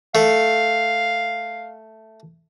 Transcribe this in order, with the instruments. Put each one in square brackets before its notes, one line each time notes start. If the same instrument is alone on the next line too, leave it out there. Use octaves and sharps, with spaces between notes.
[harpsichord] A3 [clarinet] F5